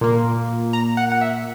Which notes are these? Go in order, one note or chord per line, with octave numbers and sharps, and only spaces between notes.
A#2 A#3
A#5
F#5
F#5
E5